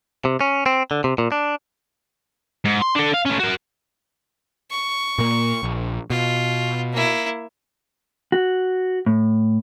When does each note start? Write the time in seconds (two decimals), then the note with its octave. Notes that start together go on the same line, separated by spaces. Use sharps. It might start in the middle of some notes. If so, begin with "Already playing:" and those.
0.25 C3
0.41 C#4
0.66 C4
0.91 D3
1.04 C3
1.18 A#2
1.32 D4
2.65 G#2
2.82 C6
2.96 D4 A4
3.14 F5
3.26 A3 C#4
3.40 F#4 A#4
4.70 C#6
5.18 A#2 A#3
5.63 A#1
6.10 B2 F4
6.93 A#3 E4
8.32 F#4
9.06 A2